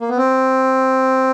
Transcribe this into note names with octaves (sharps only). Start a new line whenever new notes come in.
A#3
B3
C4